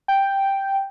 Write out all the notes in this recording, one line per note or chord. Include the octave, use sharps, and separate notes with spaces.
G5